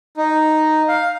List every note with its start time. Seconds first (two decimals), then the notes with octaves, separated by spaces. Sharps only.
0.17 D#4
0.88 F5